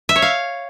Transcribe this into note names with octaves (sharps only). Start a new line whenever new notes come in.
E5
C#5
F5